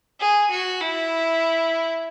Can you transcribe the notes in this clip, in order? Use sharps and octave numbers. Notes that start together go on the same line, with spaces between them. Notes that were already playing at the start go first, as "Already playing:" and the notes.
G#4
F#4
E4